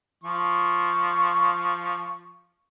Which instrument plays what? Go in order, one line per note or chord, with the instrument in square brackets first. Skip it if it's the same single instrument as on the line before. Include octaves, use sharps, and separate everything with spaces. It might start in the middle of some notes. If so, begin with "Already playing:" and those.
[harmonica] F3 C#6